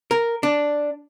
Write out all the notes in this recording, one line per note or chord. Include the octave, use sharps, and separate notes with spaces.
A#4
D4